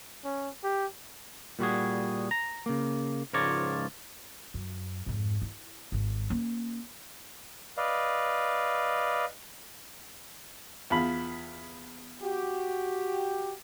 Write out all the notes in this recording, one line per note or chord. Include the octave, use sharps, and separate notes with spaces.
C#4
G4
A#2 G3 F#4 G#4
A#5
C#3 A#3
C#2 G#2 F3 A#4 C#5 D5
F#2
F2 G#2
E4
G#1 D#3
A#3 C#4
B4 D5 D#5 F5
E2 F4 B5
F#4 G4